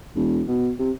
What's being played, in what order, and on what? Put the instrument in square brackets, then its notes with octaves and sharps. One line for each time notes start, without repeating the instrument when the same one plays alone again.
[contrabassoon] E1
B2
C3